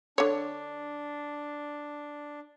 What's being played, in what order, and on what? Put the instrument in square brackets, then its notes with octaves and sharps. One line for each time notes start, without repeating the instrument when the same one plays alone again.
[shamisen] D3 C#5 [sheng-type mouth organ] D4